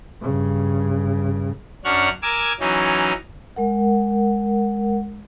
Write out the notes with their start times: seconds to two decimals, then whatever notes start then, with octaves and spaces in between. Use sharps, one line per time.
0.22 G2 C#3
1.85 F#2 C#4 D4 F#5 C#6 F6
2.23 A#4 G#5 D6 E6 G#6
2.60 E3 F#3 C#4 D#4
3.56 G#3 A#4 F#5